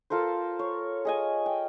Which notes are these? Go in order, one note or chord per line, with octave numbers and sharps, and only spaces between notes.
F4 A4 A#4 C5
C#5
G#4 D#5 G#5
G5